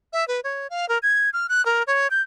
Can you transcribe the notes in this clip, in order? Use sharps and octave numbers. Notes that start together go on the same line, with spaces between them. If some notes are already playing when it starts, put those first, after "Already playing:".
E5
B4
C#5
F5
A#4
G#6
F6
F#6
A#4
C#5
G6